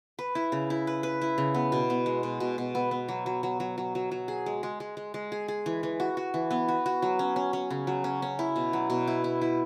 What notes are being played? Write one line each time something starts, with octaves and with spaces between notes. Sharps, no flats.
B4
E4
C#3
E4
B4
B4
E4
C#3
B3
B2
B3
G#3
B2
B2
B2
B3
B3
F#3
F#3
F#3
F#3
F#3
F#3
F#3
G#4
G#3
G#3
G#3
G#3
G#3
G#4
G#4
E3
E3
F#4
F#4
E3
B3
F#4
F#4
F#3
C#4
C#4
C#4
C#3
F#3
C#4
C#4
E4
B2
F#3
B2
E4
E4
E4